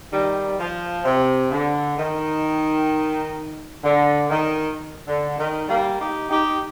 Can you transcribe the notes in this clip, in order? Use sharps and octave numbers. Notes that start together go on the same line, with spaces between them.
D#3 G3
F3
C3
D3
D#3
D3
D#3
D3
D#3
G3 A#3
D#4 G4
D#4 G4